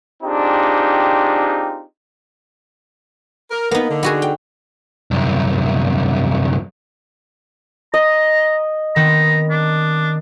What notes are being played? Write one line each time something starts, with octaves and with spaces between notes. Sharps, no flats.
C4 D4 D#4 F4 G4 G#4
A#4
A#3 B3 D#4
D3
B3 F#4 G#4
G5
C2 F#2
D#5 A#5
D#3 B3 C4 A#5
D4